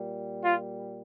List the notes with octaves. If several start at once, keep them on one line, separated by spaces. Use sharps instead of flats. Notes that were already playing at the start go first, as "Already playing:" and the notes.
Already playing: A#2 G3
F4